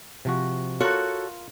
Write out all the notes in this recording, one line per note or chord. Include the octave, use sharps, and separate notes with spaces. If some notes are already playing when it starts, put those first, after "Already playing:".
C3 F3 F#4
F4 F#4 A4 A#4 C#5